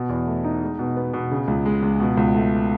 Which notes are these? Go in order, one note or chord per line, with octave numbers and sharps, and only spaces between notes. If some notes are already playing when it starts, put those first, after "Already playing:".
Already playing: B2
E2
A3
D#4
G#3
B2
B3
B2
C#3
C#2
G#3
C#2
B2
C#2
A3